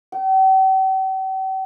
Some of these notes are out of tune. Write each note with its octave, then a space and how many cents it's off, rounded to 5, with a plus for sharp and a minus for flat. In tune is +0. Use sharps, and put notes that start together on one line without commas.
G5 -45